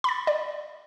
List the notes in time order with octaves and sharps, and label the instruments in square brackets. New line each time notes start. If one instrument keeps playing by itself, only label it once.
[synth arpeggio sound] B5 A6
D5